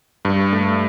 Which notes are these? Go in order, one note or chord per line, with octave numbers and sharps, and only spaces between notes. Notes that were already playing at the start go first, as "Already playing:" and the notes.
G2
A3